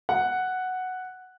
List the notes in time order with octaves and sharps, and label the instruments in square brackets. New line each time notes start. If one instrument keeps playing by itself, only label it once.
[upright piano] F#5